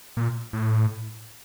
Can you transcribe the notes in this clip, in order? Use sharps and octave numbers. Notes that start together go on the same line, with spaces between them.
A#2
A2